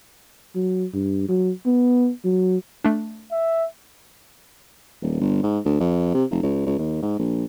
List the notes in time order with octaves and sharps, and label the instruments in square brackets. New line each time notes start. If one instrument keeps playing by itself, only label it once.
[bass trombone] F#3
G2
F#3
B3
F#3
[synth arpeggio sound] A3 D4
[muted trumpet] E5
[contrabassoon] D#1
G1
G#2
D2
F2
C3
F1
C#2
C#2
D#2
G#2
A#1